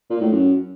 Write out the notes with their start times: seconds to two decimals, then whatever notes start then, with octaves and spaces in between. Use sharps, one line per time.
0.10 A#2
0.21 A2
0.32 F#2